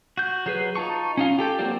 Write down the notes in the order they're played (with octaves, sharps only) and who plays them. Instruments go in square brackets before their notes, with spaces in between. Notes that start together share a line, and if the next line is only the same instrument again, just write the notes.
[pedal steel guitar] F#4 G6
F#3 G#4 B4
D#4 F4 A5 C#6
C#4 D#4 F4
G4 A4 G5
F#3 A#3 C4 F4 D5